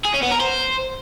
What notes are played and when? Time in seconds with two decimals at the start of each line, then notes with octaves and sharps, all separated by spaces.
0.05 G#4
0.14 C#4
0.23 B3
0.32 A#4
0.40 C5